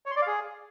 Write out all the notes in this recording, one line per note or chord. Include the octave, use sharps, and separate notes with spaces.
C#5
C6
D5
F5
G#4